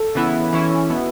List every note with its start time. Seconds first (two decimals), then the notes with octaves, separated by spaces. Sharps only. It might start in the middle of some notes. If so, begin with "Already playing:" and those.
Already playing: A4
0.15 C#3 E3 B3 E4
0.53 E3 C#4 E4
0.89 B2 B3 E4